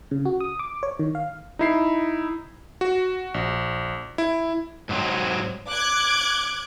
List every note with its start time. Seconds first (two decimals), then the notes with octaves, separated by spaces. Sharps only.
0.11 C#3
0.25 F#4
0.40 D#6
0.59 D6
0.83 C#5
0.99 D#3
1.15 F5
1.59 D#4 E4 C7
2.81 F#4
3.34 A#1
4.18 E4
4.89 G#2 F#3 C4
5.67 D6 F#6 G#6